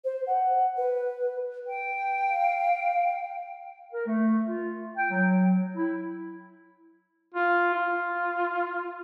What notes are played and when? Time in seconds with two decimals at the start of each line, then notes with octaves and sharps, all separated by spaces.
0.04 C5
0.27 F#5
0.77 B4
1.67 G5
2.30 F5
3.93 A#4
4.06 A3
4.47 F4
4.97 G5
5.10 F#3
5.76 E4
7.35 F4
7.73 F4